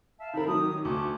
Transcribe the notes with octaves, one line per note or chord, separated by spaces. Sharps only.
E5 F5 A5
D#3 E4 A#4 A5 B5
D#3 F#3 G4 D#6
D2 A5 C#6 D6